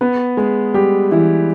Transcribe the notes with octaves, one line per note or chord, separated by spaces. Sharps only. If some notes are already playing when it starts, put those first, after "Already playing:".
B3 B4
G#3 G#4
G3 G4
E3 E4